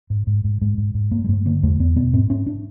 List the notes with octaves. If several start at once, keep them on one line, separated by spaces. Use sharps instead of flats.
G#2
G#2
G#2
G#2 G#3
G#2
G#2
G2 A#3
G#3
G2 A3
D3 A#3
E2 A3
E2 B3
B2 B3
G#2 C4
G#2 C#4
D4